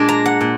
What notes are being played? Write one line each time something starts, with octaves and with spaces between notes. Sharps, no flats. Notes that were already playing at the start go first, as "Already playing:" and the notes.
Already playing: A#2 G#3 D4
A#5
F#5
A#2